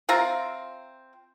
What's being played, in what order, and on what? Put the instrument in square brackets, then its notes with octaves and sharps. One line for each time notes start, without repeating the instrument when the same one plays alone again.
[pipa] C4 F4 E5 A#5